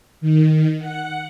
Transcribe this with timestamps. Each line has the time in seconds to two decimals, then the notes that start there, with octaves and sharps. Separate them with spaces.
0.21 D#3
0.79 F#5